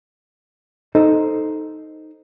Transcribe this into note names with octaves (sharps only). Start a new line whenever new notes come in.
D#4 A4 C5 D#5